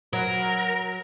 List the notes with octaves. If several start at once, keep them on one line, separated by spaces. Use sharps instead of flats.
F#3 A#4